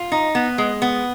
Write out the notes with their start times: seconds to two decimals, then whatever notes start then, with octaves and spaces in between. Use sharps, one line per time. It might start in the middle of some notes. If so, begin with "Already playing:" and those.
Already playing: F4
0.12 D#4
0.35 B3
0.58 G#3
0.82 B3